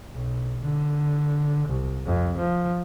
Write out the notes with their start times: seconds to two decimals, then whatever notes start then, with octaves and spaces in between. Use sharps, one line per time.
0.12 B1
0.62 D3
1.68 C2
2.06 F2
2.38 F3